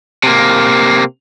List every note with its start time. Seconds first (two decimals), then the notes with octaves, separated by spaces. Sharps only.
0.24 C3 A#3